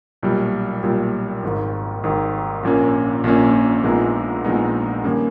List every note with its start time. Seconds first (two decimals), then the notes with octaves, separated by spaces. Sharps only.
0.23 B1 A#2 G3
0.83 B1 A#2 G3
1.43 G#1 G#2 D#3
2.04 G#1 G#2 D#3
2.63 A#1 A#2 A#3 C#4
3.24 A#1 A#2 A#3 C#4
3.84 A#1 A#2 G#3 B3 D#4
4.44 A#1 A#2 G#3 B3 D#4
5.04 G2 D#3 A#3 C#4